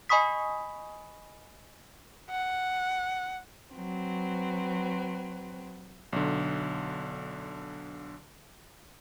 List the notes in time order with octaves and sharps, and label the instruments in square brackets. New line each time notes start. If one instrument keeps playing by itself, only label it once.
[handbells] D#5 G#5 B5 C#6 D#6 B6
[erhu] F#5
[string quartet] F#3 C4 B4
[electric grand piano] B1 D3